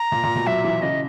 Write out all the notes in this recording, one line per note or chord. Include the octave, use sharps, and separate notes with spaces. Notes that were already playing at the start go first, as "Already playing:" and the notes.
Already playing: A#5
A#2
A#2
B2
F#3 E5
E3
C#3 D#5